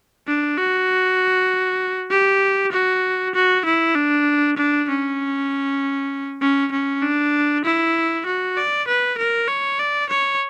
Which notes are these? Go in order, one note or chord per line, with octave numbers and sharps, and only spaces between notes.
D4
F#4
G4
F#4
F#4
E4
D4
D4
C#4
C#4
C#4
D4
E4
F#4
D5
B4
A#4
C#5
D5
C#5